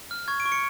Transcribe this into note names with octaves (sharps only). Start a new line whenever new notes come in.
F6
C#6 G#6
D7
C#6
C#7